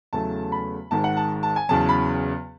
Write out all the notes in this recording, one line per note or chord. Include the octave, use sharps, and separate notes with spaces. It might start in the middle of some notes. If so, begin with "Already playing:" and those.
E2 C#3 F#3 A3 A5
B5
G#1 G#2 D#3 G#3 A5
F#5
A5
A5
G#5
E2 C#3 F#3 A5
B5